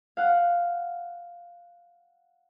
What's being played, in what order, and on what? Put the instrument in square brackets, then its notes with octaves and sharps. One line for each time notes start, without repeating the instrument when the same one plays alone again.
[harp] F5 F#5